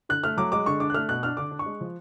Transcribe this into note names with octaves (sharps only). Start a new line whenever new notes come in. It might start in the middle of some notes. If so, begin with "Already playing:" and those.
D3 F#6
A3 F6
F#3 D6
G#3 D6
D3 C#6
D4 D6
F#6
A3 F6
B2 F#6
D4 F6
D3 D6
D4
C#6
G#3
F3